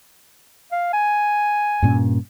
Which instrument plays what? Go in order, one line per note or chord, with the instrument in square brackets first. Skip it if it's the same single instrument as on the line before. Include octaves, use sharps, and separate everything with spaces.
[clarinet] F5
G#5
[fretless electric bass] G2 A#2 C#4